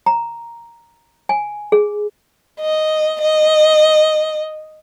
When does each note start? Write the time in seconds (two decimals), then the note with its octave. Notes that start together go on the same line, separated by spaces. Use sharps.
0.06 A#5
1.29 G#5
1.72 G#4
2.60 D#5
3.21 D#5